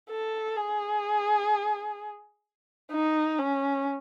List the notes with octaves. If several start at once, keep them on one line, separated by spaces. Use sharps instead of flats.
A4
G#4
D#4
C#4